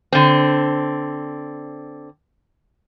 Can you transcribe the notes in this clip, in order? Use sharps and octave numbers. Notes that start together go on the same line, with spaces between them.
D3 C4